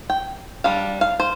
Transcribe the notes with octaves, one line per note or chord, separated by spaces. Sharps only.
G5
G3 D4 F5
F5
C5